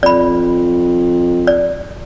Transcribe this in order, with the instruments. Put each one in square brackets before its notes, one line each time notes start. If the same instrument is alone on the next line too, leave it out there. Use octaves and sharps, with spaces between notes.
[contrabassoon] F2 [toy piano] D5 B5
[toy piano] D5